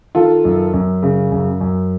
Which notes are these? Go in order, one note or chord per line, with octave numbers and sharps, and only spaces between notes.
D#3 F4 A4
F#2
F#2
C#3
F#2
F#2